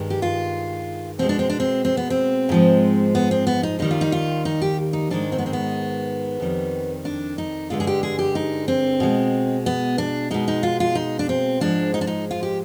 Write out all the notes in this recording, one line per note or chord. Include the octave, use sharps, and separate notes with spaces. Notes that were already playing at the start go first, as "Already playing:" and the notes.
Already playing: G2 D#3 G#3
G4
F4
B2 G#3 C4
D4
C4
D4
C4
C4
B3
C4
G#2 F3 G#3
B3
C4
B3
D#4
D#2 D#3 G3 D#4
F4
D#4
F4
D#4
G4
D#4
G#2 D#3 G#3 D4
C4
B3
C4
B3
F2 D#3 G3
D4
D#4
G2 D3 G#3 F4
G#4
G4
G#4
G4
D#4
C4
B2 G#3
B3
D4
B2 G#3 D#4
D#4
F4
F4
D#4
D4
C4
G#2 F3 G#3 D4
D#4
D4
D#4
F4
G4